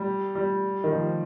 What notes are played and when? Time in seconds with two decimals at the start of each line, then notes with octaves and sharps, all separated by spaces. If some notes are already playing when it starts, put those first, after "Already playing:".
Already playing: G3
0.35 G3
0.84 D#3
0.93 F3